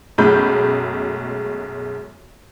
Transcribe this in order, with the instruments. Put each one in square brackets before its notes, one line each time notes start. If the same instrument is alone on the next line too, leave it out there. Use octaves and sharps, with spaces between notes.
[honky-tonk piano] B1 F#2 G#3 A3 B5 G6